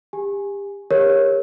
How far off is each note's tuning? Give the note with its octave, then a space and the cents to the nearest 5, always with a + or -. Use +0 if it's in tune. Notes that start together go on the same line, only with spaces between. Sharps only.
G4 +30 G#5 +0
G4 +35 A#4 +0 C#5 -10